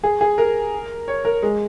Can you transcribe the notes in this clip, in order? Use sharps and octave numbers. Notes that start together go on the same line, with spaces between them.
G#4
G#4
A#4
C#5
A#4
G#3